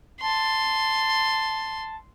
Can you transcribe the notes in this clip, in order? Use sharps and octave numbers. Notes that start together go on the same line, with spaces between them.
A5 C6